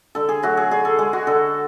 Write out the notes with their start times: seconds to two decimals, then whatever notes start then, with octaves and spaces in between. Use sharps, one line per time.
0.15 D3 A4
0.29 G#4
0.43 F#3 A3 F#4
0.57 G#4
0.71 D3 G#4
0.85 A4
0.99 G#3 G#4
1.13 F#4
1.27 D3 A4